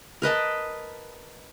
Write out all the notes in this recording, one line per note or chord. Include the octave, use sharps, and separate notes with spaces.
A#4 B4 D#5 A5